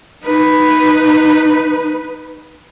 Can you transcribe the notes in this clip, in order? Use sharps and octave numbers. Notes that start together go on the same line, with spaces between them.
D#4 B4